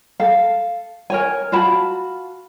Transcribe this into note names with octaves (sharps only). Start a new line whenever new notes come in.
A4 F5
A#4 C#5 G#5
F4 F#4 A5 B5